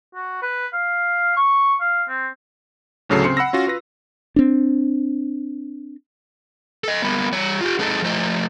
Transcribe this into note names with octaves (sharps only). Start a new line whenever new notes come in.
F#4
B4
F5
C#6
F5
C4
D2 A2 C#3 F#3 A4 C7
C#3 C4 C6 C#7
F#5 B5 E6 A#6
C#4 F4 F#4
F4 B4 A#6
C4 D4
A4 D#5
G3 A#3 B3
G3 C#5
F4 G4
G#3 C4 D#4 A4
F3 A3 C5 D#5